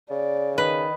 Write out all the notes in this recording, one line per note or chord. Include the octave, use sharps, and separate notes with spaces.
C#3 D5
D#3 B4